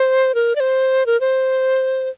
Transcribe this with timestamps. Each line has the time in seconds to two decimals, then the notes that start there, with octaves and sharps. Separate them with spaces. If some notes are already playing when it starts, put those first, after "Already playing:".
Already playing: C5
0.35 A#4
0.56 D5
0.60 C5
1.06 A#4
1.21 C5